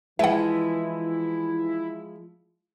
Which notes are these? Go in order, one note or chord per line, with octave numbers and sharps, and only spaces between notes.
E3 F3 G#3 E4 B4 E5 F#5